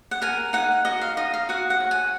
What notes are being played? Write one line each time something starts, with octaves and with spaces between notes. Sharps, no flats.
F#5
A#4 G#5
D#4 F#5
F#4 D#5
F5
D#4 D#5
F5
F#4 F#5
F#5
C#5
G#5